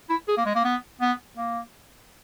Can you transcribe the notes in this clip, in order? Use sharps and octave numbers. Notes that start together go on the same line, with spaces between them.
E4
G#4
A#3
G#3
A#3
B3
B3
A#3